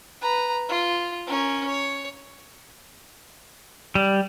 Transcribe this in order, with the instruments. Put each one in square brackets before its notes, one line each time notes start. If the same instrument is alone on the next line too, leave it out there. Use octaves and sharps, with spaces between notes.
[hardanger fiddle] B4 A#5
F4
C#4 A#4
C#5
[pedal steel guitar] G3